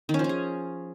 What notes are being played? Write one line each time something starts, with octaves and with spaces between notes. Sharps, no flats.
D#3
C#4
F3
C#4
G#4